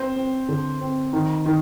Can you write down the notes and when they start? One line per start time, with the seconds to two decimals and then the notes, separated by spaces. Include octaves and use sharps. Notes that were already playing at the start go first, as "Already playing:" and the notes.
Already playing: C4 C5
0.16 C4
0.48 D3
0.81 C4
1.13 D#3
1.46 D#3